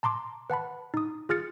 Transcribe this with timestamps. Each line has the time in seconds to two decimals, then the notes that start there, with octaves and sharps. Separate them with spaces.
0.03 A5 A#5 C6 D6
0.50 B4 F#5 A5 B5
0.94 D#4 D#6
1.29 F4 G#4 F6 A6 C#7